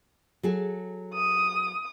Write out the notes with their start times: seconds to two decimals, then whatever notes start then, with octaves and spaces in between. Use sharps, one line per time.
0.43 F#3 G#4 A4
1.14 D#6